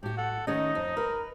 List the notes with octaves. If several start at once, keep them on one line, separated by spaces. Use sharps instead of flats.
A2 F#4 G4
A4 F#5
D#3 A3 C#4 D#4 D#5
F2
A#4 B4